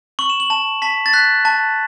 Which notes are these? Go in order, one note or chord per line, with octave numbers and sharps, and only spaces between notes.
C#6 F#7
E7
F#7
A5 E7
A5 B6
A6
F#6 B6
A5